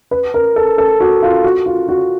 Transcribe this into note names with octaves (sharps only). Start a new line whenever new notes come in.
B4
A#4
A4
A4
F#4
F4
F#4
F4
F#4